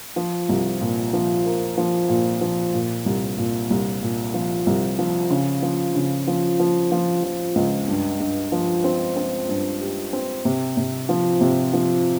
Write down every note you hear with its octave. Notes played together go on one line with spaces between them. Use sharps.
F3
C2
A#2
F3
A#3
F3
A#2
F3
A#2
C2
A#2
C2
A#2
F3
C2
F3
C#3
F3
C#3
F3
F3
F3
F3
C#2
G2
G2
F3
C4
C4
G2
G4
C4
C3
C3
F3
C3
F3